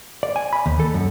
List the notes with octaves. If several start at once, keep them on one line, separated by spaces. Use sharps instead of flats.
D5
G#5
B5
D#2
A4
F#2